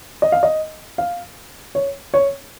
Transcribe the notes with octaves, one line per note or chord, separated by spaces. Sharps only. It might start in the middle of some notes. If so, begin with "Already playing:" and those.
D#5
F5
D#5
F5
C#5
C#5